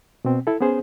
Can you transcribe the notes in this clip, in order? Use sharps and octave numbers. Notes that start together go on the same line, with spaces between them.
B2 C4
E4 A4
B3 C#4 G#4 C5